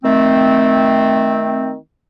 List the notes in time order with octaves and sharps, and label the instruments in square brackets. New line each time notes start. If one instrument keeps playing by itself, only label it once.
[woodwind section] D#3 A3 C4